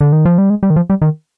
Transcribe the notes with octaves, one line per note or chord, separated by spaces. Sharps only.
D3
D#3
F3
G3
G#3
G3
D#3
F3
G3
D#3